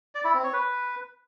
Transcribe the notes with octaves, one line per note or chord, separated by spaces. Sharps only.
D5
E4
C4
C#5
B4